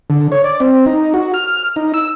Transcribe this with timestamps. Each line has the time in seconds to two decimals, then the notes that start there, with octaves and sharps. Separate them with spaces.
0.10 D3
0.32 C#5
0.44 D5
0.60 C4
0.86 D#4
1.14 F#4
1.34 F6
1.76 D#4
1.94 E6